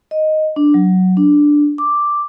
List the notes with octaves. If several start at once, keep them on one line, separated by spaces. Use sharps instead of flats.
D#5
D4
F#3
D4
D6